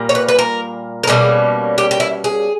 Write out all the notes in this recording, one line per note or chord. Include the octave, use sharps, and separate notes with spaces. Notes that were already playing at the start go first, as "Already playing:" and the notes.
Already playing: A#2 G3 A#3
C#5
B4
B4
A#4
A#4
B2 G3 A#3 C#4 G#4
G4
G4
E4
G#4